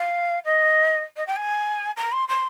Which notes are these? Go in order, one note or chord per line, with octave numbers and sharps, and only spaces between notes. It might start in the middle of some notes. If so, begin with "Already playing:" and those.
Already playing: F5
D#5
D#5
G5
G#5
A#5
C6
C6